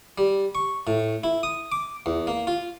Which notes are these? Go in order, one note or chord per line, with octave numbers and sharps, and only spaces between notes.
G3
C#6
A2
E4
D#6
D6
E2
A#3
F4